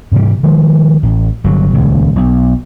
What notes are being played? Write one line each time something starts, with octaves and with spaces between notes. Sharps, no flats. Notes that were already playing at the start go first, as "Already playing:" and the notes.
G#2 C3 E3 G3
D#3 F3 G#3
A1
G1 F#3
D#1 C#2
B1